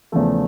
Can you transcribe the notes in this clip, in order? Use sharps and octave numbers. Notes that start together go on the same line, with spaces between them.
E2 C#3 F3 A3